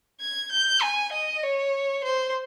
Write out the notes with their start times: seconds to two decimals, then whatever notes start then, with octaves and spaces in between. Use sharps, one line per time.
0.20 G#6
0.51 G6
0.82 G#5
1.12 D#5
1.43 C#5
2.04 C5